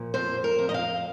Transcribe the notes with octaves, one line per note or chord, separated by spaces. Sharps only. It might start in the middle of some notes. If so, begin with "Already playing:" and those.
Already playing: A#2 F3
F2 C5
A#4
F2
D#5
F5